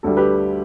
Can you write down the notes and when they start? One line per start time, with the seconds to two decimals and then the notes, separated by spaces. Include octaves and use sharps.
0.03 D2 D3 G3 A4
0.17 G4 B4